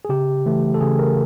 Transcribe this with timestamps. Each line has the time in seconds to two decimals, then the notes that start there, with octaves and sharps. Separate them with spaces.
0.05 G#4
0.09 C#3 G4
0.46 E3 A3
0.74 A4
0.81 C#3 G#4
0.99 A#4